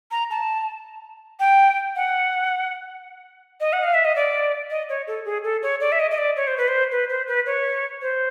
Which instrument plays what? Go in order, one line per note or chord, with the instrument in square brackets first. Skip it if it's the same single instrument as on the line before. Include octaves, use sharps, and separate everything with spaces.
[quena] A#5
A5
G5
F#5
D#5
F#5
F5
E5
D#5
D5
D#5
C#5
A4
G#4
A4
C#5
D5
E5
D#5
D#5
D5
C#5
C5
B4
C5
B4
C5
B4
C#5
C5